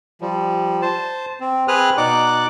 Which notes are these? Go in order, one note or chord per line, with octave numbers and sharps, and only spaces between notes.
F3 G3
C5 A5
C4
C4 G#4 B4 D#6 F6 F#6
B2 D#4 D5 F#5 D6 F#6